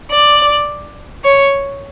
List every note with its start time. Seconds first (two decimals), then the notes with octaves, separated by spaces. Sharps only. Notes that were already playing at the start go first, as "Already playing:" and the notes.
0.12 D5
1.24 C#5